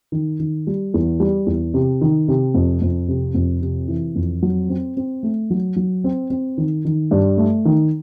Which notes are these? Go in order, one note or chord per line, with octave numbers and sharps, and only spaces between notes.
D#3
D#3
G3
E2
G3
E2
C3
D#3
C3
F2
F2
C3
F2
C3
E3
F2
F#3
C4
C4
A3
F#3
F#3
C4
C4
D#3
D#3
G2
A3
D#3